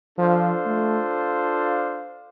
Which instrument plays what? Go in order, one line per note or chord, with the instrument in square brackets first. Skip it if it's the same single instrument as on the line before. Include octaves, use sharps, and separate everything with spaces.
[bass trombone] F3 [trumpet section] D4 F4 A4 C5 F5
[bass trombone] A3